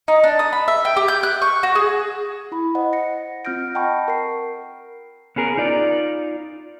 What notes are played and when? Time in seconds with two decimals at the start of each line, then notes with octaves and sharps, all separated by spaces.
0.08 D#4
0.24 D4
0.39 D#6
0.53 B5
0.68 E5
0.85 G5
0.97 G4
1.08 G6
1.23 F#6
1.42 C#6
1.63 F#4
1.75 G#4
2.52 E4 B5
2.75 C5 D#5 F#5
2.93 A#6 C#7
3.45 C4 F4 F6 G6 A#6 D7
3.75 D#5 F#5 G5 A5 B5 C#6
4.08 A#4 C7
5.36 B3 C#4 G#4 A#4
5.57 D#4 F4 D5